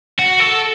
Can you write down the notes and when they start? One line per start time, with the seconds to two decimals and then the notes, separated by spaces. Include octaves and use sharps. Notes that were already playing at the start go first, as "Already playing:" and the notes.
0.19 F#4
0.40 A4